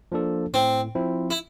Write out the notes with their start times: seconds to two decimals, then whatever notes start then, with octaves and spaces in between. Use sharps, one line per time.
0.12 F3 A#3 D4 A4
0.53 A2 C4
0.95 F3 C4 E4
1.30 E4